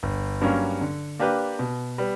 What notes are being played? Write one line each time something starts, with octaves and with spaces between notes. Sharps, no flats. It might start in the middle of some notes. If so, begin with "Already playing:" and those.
G1
G2 F#3 A#3 C#4
D3
A#3 D4 G4 B4
B2
G3 B3